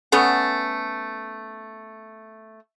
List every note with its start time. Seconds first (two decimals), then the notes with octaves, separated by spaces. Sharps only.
0.12 A3 B3 C#4 F#5